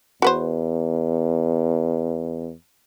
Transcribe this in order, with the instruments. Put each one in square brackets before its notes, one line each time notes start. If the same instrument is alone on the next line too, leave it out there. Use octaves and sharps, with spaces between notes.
[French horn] E2 [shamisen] F#4 B4 C5